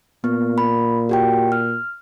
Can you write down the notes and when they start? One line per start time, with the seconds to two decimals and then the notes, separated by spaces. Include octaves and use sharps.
0.24 A#2 B3
0.58 B5
1.09 F#4 G4 G5
1.52 F6